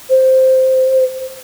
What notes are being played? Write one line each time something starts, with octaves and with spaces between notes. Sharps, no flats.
C5